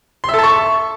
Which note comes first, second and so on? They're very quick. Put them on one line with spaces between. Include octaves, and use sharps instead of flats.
C6 E5 A4 A5 C#6